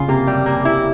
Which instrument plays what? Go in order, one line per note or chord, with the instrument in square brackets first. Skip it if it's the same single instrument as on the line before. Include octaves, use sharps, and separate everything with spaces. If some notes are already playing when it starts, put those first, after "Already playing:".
Already playing: [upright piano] C#3 [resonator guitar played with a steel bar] F4
[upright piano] C3 [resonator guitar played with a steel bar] A#3
[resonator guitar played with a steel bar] G3
A#3
E4